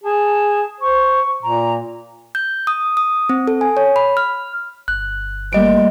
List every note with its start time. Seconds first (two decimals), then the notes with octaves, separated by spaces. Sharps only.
0.04 G#4 A5
0.81 C5 C#6
1.43 A#2 A#5
2.35 G6
2.67 D#6
2.97 D#6
3.29 C4
3.48 A4
3.61 G#5
3.77 C#5
3.96 B5
4.17 F6
4.88 G1 F#6
5.53 G3 A3 A#3 D#5 D7